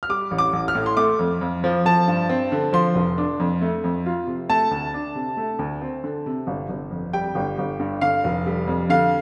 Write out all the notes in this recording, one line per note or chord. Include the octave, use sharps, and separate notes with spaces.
F6
G3 D6
A1
D6
A1
F6
A2
C6
A3 D6
F2
F2
F3
F3 A5
G2
C4
D3
F3 C6
F1
D4
F2
A3
F2
F4
C3
A3 A5
D2
D4
C3
A3
D2
C4
D3
C3
G1
G1
F2
G3 G5
G1
G1
G2
D3 F5
F1
G3
F2
D3 F5